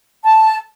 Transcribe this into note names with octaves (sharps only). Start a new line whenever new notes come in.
A5